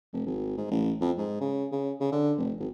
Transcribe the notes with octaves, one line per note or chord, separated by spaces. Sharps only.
F1
G#1
G#2
A1
F2
G#2
C#3
C#3
C#3
D3
F1
G#1